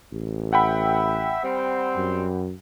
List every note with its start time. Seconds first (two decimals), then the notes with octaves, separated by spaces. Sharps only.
0.13 A1
0.53 E5 F#5 G5 B5
1.44 G3 C4
1.96 F#2